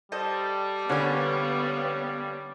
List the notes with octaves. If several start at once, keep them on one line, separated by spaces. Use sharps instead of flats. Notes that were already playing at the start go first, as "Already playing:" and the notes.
G3 A4 C5 D#5
D3 A#3 B3 C#4 C#5 F5 B5